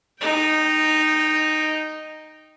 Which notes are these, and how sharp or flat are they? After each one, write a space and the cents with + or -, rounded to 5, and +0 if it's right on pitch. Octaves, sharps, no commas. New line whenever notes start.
D#4 -10 G5 +0